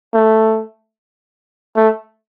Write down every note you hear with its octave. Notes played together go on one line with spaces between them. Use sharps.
A3
A3